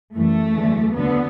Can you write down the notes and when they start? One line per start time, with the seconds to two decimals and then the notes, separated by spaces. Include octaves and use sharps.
0.14 F#2 E3 G3 A3
0.55 E2 D3 F#3
0.96 D2 D3 F#3 B3